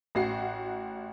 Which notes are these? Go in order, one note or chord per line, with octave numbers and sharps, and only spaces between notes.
A1 F#4 C7